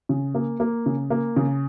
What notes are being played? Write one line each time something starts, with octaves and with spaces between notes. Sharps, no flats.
C#3
A#3
A#3
C#3
A#3
C#3